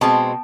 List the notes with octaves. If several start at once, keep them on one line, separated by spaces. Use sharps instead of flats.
B2 G#3 C4 A5